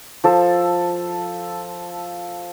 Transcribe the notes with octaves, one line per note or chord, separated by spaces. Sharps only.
F3 A4